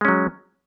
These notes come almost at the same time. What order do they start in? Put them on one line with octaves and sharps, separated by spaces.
G#3 C#4 F#3